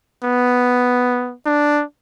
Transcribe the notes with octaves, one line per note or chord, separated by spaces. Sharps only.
B3
D4